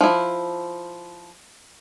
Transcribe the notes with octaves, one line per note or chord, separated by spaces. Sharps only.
F3 E4